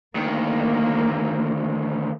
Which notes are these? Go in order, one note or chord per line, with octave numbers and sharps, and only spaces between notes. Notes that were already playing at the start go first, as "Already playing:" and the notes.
D2 D#3 A#3